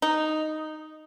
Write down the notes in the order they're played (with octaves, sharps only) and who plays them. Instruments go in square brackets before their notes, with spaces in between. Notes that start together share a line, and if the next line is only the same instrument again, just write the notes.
[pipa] D#4